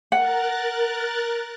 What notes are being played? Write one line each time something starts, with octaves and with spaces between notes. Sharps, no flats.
A#4 F#5 F#6 A6